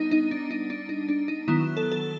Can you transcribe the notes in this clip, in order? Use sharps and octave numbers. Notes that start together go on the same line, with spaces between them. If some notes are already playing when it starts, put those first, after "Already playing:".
Already playing: G3 B3 D4 D#4
D#4
D4
D#4
D4
D#4
D4
D#4
D#3 F#3 B3 E4
A4
A4